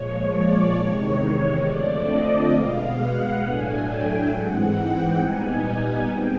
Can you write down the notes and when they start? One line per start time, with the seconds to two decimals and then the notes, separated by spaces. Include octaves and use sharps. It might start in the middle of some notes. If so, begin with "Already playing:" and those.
Already playing: A#2 F3 G#3 C#5
0.29 D5
0.73 E2 C3 D#3 G#3 C#5
1.62 F2 D3 F3 A3 C4 D5
2.07 D#5
2.51 B2 G#3 B3 F5
2.95 F#5
3.40 A2 F#3 A3 D4 G#5
3.85 G5
4.29 G#2 E3 G#3 C4 F#5
4.74 G5
5.18 A#2 G3 B3 D#4 G#5
5.62 G#5
6.06 G#3 C4 G5